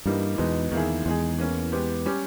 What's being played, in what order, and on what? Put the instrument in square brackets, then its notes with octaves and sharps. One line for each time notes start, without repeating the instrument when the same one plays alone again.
[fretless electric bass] G2 [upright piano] E3 G3 A#3 D#4
[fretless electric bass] E2 [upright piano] B2 G#3 B3 D#4
[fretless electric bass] E2 [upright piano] D#3 A#3 E4 G#4
[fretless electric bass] E2 [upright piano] G#3 D#4 G#4
[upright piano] E3 A#3 C#4
G#3 B3 G4
G3 C#4 G4